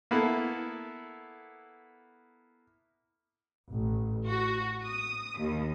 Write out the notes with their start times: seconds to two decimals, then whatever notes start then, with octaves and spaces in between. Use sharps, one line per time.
0.11 A#3 B3 E4 A4
3.72 A1
4.28 F#4
4.83 D#6
5.40 D#2